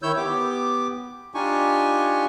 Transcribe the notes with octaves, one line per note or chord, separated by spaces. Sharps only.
D#3 E4 C#5 E6 G6
B3 G4 D6
D4 D#4 F4 G4 G#5 C#6